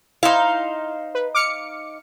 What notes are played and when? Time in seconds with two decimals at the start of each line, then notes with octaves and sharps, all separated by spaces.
0.23 D#4 E4 C5 F5
1.15 B4
1.35 D6 F6 C#7